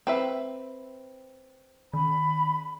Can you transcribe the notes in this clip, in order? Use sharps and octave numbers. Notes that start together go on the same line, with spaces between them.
C4 B4 E5
D#3 B5